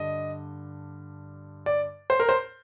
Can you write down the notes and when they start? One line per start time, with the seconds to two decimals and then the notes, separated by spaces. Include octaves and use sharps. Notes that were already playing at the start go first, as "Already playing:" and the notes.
Already playing: G2 D3 D#5
1.66 D5
2.10 C5
2.20 A#4
2.29 C5